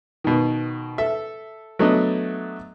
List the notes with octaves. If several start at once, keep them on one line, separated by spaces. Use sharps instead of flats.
B2 D#3
A4 E5
F#3 A3 B3 D4 D#5